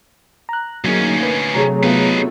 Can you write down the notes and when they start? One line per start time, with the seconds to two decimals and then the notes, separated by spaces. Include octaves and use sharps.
0.49 A#5 F#6
0.84 D2 F#3 A#3 C#4 D#4 G#4
1.23 B4
1.54 C3 F#3 A3 G#4 C#5 A#5
1.83 B3 D#4 F4 B4